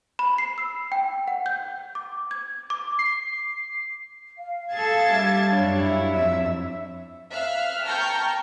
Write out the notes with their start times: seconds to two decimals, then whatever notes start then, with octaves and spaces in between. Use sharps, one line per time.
0.19 B5
0.38 C7
0.58 E6
0.92 G5
1.28 F#5
1.46 G6
1.95 D6
2.31 G#6
2.70 D6
2.99 C7
4.38 F5
4.73 G#4 A4 A5 G#6 A6
5.11 G3 D4 E5
5.52 F#2 G3 D4 C#5
5.83 E4
6.16 F2 E5
7.31 E5 F5 F6 F#6
7.84 G5 A5 A#5 C#6 F6 G6